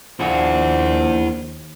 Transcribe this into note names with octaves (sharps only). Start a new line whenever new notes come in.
D#2 F3 D4 E4 G#4 A#4 C5 F#5